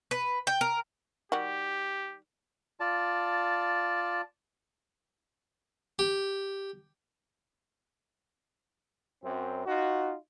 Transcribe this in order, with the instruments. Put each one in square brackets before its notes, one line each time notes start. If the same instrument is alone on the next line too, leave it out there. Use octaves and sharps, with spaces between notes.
[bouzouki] B4
G5
A#4
[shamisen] D#3 G3 F#4 [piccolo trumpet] G4
[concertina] F4 D5 A5
[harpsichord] G4
[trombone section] F#2 C4
D#4 F4 F#4